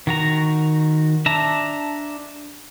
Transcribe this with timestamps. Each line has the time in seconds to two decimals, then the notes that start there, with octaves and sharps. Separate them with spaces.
0.07 D#3 F#4 A#5
1.26 D4 E5 A5 A#5